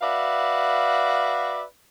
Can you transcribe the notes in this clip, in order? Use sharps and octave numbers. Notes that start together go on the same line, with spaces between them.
F#4 B4 D5 E5 F5